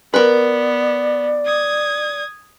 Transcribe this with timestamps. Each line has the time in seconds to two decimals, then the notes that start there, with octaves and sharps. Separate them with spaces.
0.14 B3 A#4 B4 D5
1.46 D#6 G#6